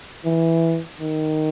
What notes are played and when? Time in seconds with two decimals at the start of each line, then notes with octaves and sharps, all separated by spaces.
0.25 E3
1.00 D#3